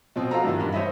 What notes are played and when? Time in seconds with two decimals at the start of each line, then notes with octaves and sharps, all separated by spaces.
0.16 B2 F3 C4
0.31 F4 F#4 A4 A#5
0.44 G2 D#3 E3
0.60 G2 B5
0.72 C5 C#5 D#5 E5 B5